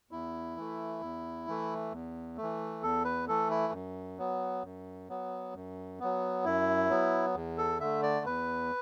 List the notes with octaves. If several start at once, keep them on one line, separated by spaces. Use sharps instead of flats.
E2 E4
E3 A3
E2
E3 A3
E2
A3
E3
E2 A4
B4
E3 A3 A4
E4
F#2
F#3 B3
F#2
F#3 B3
F#2
F#3 B3
F#2 E4
F#3 B3
E2
A4
D3 A3 E5
D5
E2 B4